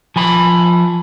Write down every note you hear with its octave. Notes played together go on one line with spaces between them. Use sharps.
F3 G#5 B5